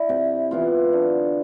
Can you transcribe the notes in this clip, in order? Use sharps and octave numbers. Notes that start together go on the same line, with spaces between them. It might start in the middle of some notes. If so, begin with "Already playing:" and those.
Already playing: E4 D5
C3
E3 B3 F4
D3